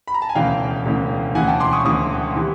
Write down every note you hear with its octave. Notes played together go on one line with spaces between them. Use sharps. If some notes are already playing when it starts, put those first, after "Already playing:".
B5
A#5
A5
G#5
E1 D2 C#3 E3 F5 G5
E1 D2 C#3 E3
E1 D2 C#3 E3 F#5 G#5
G5 A5
C6 D6
C#6 D#6
E1 D2 C#3 E3 C#6 D#6
C3 E3